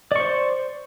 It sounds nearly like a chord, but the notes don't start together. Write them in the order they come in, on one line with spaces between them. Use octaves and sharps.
D5 C#6 C5